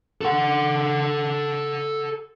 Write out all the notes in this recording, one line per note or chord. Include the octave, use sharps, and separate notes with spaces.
A4 F#5